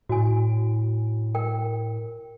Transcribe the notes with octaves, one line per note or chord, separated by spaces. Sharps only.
A2 F#4 G#5
A#4 G5